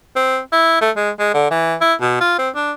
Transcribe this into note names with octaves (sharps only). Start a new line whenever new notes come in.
C4
E4
A3
G#3
G#3
D3
E3
E4
B2
F4
C4
D4